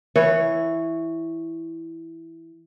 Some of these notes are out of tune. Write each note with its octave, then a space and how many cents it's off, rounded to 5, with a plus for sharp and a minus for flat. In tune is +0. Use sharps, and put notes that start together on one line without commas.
E3 +0 C#5 +0